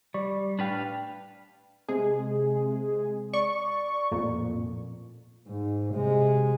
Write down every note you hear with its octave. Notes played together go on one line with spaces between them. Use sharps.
G3 D5 C#6
A2 D4 B4 F5 G5
C3 G#3 G#4
D5 C#6
A1 F2 A#2
G#2
C3 G#3